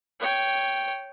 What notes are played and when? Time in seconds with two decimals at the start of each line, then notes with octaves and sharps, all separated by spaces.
0.20 C#5 G5